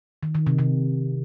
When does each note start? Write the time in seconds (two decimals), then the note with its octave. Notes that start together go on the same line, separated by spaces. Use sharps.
0.23 D#3
0.35 D#3
0.47 C3
0.59 C3